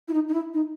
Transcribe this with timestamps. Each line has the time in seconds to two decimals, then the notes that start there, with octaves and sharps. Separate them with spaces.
0.08 E4
0.13 D#4
0.28 D#4
0.33 E4
0.54 D#4